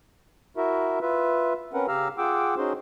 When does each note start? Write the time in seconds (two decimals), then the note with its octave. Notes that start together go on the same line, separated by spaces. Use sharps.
0.57 E4 F#4 A#4 E5
1.01 F4 B4 E5
1.73 C4 C#4 A#4 B4 F#5
1.88 C#3 G4 F5 A#5 E6 F6
2.18 F4 G#4 F#5 G5 D6 E6
2.58 C#4 D#4 F#4 G#4 C5 C6